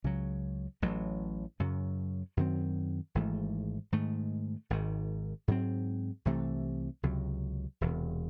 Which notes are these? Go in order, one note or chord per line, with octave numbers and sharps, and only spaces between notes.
C#2 C#3 F#3
A1 A2 F#3
F#2 C#3 F#3
F#2 D#3 F#3 C4
G#1 G#2 E3 A3
G#2 D#3 A3
G#1 G#2 D#3
G#2 F#3 C4
C2 C3 E3 A3
C#2 C3 F#3
E1 E2 C3